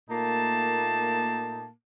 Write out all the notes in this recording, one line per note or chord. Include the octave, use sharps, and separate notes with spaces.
A#2 A3 A#3 D#4 A5